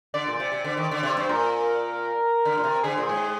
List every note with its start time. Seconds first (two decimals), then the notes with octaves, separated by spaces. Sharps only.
0.14 D3 D5
0.27 A#2
0.40 C3
0.52 C3
0.64 D3
0.77 D#3
0.91 D3
1.03 C3
1.17 G2 C5
1.29 A#2 A#4
2.45 D3
2.58 A#2
2.64 C3
2.83 D3 G#4
2.98 A#2
3.09 G#2